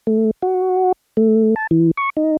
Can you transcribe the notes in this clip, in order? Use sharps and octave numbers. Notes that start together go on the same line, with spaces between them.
A3
F#4
A3
A5
E3
C#6
D#4